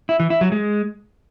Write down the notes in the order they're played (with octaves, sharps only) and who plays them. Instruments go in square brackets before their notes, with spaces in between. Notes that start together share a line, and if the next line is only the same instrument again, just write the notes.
[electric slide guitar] E4
E3
E4
F#3
G#3